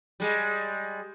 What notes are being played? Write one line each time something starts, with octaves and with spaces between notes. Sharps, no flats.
G3 G#3